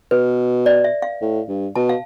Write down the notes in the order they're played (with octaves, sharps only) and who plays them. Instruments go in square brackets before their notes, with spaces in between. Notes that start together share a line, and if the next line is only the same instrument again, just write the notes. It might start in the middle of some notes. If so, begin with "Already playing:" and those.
[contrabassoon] B2 [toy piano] B4
[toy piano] D5
E5
F5
[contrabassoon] A2
G2
[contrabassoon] B2 [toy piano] A5
[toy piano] F5